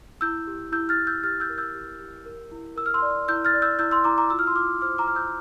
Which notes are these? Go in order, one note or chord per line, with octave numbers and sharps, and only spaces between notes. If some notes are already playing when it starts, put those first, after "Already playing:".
E4 E6 G6
G4
E4 E6 G6
F6 A6
E4
E6 G6
G4 F6 A6
E6 G6
A#4
E6 G6
G4
G4
A#4
E4
A#4 E6
F6
C6 E6
D5
E4 E6 G6
F6 A6
D5
E6 G6
E4 E6 G6
C6 E6
E4 A#5 D6
A#5 D6
F4 E6
F6
C6 E6
F4 D6 F6
C5 D6 F6
A#5 D6
C5 F6
E6 G6